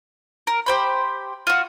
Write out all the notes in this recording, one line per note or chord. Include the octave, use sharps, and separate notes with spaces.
A#4
G4 C5 B5
F4 F#4